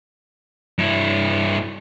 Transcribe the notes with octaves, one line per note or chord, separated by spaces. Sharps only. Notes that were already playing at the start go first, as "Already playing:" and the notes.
G2 E4